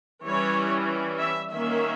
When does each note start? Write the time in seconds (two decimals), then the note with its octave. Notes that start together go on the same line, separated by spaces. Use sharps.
0.24 E3 G3 C#4 C#5
1.19 E5
1.51 D#3 A#3 C#4 E5